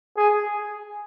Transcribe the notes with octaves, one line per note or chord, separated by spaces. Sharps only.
G#4